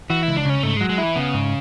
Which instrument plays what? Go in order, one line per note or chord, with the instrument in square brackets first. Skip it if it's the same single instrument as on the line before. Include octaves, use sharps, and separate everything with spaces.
[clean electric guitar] E3 [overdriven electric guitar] F#4
[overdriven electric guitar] E4
[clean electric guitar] C#2
[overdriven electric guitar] D4
[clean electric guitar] C#3 [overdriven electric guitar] C#4
[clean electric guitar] G#2 [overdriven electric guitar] A3
[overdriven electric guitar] G#3
[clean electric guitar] F#3
[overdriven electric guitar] G#3
[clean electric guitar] E4
[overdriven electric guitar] E3
[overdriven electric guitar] C#3 [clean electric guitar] B3
[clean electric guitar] G#2